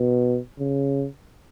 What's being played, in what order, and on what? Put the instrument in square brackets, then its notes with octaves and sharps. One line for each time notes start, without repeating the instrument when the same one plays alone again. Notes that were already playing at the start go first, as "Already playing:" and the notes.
Already playing: [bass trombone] B2
C#3